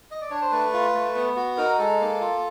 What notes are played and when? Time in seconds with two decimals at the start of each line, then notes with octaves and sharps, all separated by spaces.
0.11 D#5
0.21 D5
0.30 D4 C#5
0.41 C5
0.51 A3 B4
0.73 F4
0.95 A3
1.15 B3
1.36 F#4
1.57 D#4 A#4
1.79 G#3 A4
2.00 A#3
2.20 F4